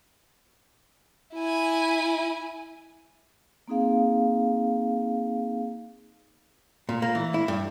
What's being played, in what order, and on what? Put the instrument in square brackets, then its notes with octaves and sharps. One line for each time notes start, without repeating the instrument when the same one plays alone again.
[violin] E4 G#5
[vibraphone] A#3 C4 D#4 G#4 F5
[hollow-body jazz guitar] A#2
A#3
E3
E4
G2